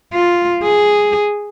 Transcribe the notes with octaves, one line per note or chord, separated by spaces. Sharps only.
F4
G#4